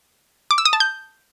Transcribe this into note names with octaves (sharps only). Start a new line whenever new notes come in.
D6
E6
D#6
A5
G6